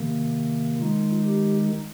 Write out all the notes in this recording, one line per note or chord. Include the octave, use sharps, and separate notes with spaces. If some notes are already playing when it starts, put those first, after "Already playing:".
Already playing: C3 D#3 A#3
D#3 G#3 D#4 F4
G4